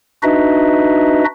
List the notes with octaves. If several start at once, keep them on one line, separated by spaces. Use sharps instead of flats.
D4 D#4 F#4 B4 D#5 E5